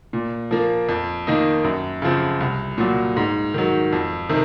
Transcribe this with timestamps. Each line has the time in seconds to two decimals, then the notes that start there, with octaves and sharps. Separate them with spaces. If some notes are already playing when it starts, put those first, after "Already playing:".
0.13 A#2
0.51 F3 A#3
0.89 F2
1.27 D#3 A#3 D#4
1.64 F#2
2.02 C#3 F3 C4
2.40 C2
2.78 A#2 F#3
3.17 G#2
3.54 D#3 F#3
3.93 F2
4.29 C3 D#3